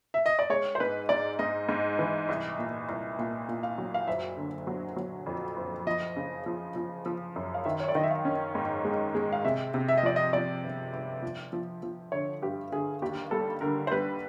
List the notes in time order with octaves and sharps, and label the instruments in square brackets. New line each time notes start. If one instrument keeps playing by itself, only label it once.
[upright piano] E5
D#5
D5
[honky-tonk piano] G#3 [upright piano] C#5
[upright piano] C5
[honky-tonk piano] G#2 [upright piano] B4
[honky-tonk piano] G#2 [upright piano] D5
[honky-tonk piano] G#2 [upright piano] D#5
[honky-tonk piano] G#2
E3
C2
A#2
C2
A#2
A#2
[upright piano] F5
[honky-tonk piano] F#3
[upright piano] F5
[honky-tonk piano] F#1 [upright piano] E5
[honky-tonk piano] D3
F#3
F#3
F2
F#1
[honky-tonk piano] F3 [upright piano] D#5
[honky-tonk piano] C#3
F3
F3
F3
F#2
[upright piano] F5
[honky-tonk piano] D#3 [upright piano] E5
[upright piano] C#5
D5
[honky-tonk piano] D#3 [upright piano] D#5
[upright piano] E5
F5
[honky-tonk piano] C#4
G#2
G#3
G#3
[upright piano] F5
[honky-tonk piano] C3 [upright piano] E5
[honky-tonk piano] C3
[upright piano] E5
D#5
[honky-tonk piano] F3 [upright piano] D5
[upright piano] D#5
[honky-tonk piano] F3 [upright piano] D5
[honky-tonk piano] G1
G1
F3
F3
F3
[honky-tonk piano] D3 [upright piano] C#5
[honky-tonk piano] G2 [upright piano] G4
[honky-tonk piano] D3 [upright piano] G#4
[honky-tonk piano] D#2 [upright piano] G4
[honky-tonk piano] G3 [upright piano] A4
[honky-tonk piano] D3 [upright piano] A#4
[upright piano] C5
[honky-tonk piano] G3 [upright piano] B4